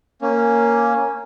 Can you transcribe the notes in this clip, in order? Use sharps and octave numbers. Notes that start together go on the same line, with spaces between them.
A#3 C#4